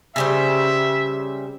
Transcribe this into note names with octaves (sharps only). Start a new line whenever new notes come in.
C#3 G3 C5 E5